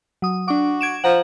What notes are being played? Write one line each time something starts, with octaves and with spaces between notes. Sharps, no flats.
F#3 D#6
D4 F#4 D6
G#6 D7 E7
F3 F#5 A#5